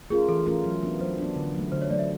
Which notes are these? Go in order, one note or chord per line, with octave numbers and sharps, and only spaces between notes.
A3 C#4 F4 G#4 A#4
E3 A4
A3 C#4 F4 A#4
F#3
B3 D4
F#3 C5
B3 D4
D3
F#3 A3
D3 C5
C#5
F#3 A3 D5
E5